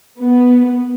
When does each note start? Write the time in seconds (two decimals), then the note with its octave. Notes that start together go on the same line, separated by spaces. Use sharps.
0.19 B3